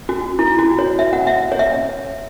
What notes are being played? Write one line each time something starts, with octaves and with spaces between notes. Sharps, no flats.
F#4
E4
F#4
C#5
E5
F#5
E5
C#5
E5